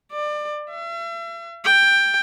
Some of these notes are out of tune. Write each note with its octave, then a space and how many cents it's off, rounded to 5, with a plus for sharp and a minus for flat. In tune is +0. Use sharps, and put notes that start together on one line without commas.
D5 +25
E5 +40
G5 +10